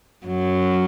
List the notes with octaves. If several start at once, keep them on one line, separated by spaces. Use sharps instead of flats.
F#2 F#3